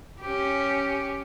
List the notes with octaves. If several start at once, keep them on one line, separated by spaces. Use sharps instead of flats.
C#4 G4